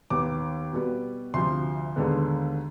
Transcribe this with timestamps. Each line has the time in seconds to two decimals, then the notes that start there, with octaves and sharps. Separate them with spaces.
0.10 D#2 D#3 B3 D6
0.72 B2 G3 B3
1.34 D2 C3 F3 C6
1.96 D#2 D3 G#3 B3